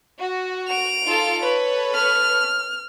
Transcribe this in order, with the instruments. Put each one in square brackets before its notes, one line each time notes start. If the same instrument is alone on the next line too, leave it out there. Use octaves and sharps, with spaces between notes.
[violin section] F#4
[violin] D7 F7
[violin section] D#4 F4 A4
A4 B4 C#5
[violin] F6